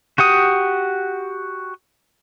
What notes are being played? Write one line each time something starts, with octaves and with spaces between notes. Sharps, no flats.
F#4 G4 F#5 D#6